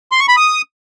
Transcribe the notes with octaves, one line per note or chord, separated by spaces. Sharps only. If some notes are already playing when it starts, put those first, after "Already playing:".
C6
C#6
B5
D#6